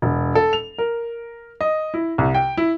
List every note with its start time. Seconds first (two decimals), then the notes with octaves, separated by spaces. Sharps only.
0.02 E1
0.35 A4
0.53 F7
0.78 A#4
1.61 D#5
1.94 E4
2.18 C2
2.34 G5
2.57 E4